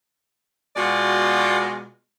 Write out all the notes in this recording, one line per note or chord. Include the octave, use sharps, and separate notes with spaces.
B2 G#3 B3 F4 F#4 D5